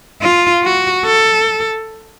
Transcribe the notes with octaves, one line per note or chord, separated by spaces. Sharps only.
F4
F#4
A4